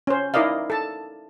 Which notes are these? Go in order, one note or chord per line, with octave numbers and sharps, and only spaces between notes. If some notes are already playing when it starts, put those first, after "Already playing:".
C#4 C5
D#4 E4 A#4 D5 D#5 F5
A4 A5